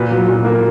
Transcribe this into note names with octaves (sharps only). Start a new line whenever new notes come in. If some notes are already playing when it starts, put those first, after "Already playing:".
Already playing: A#2 B4
F#3
A#2
A#3